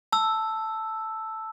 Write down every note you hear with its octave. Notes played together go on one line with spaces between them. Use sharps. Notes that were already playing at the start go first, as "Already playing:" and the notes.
A5 E6